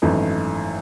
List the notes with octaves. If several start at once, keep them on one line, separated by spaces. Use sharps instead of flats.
G#1 F#2 E3 A3 D#4